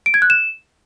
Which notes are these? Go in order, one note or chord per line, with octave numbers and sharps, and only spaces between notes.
D7
G#6
F#6
E7